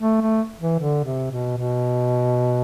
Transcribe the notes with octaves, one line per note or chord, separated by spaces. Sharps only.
A3
A3
E3
D3
C3
B2
B2